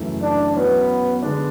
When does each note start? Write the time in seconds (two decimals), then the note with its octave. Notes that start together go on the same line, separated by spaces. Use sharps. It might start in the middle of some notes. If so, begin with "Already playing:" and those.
Already playing: F#2 C#3 E3 A3
0.21 D4
0.55 F#3 B3 C#4 E4
1.22 D3 G#3 B3 D4